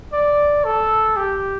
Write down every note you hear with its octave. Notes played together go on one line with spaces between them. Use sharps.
D5
A4
G4